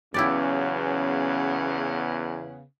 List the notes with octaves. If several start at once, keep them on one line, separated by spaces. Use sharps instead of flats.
E2 C#3 F#3 B3 C#4 E4 G4 D5